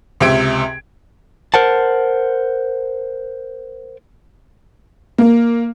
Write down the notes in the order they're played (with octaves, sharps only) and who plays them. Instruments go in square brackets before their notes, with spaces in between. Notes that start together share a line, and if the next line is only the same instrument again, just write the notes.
[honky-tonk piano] C#2 C3 G4 E5 G#6 D7
[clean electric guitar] A#4 C5 F#5 A5
[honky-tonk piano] A#3